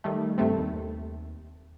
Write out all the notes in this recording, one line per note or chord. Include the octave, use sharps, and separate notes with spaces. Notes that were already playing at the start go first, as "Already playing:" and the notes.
D#3 G3 A3
G2 C3 G3 A3 C4
D#2